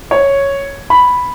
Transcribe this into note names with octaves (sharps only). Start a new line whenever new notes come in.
C#5
B5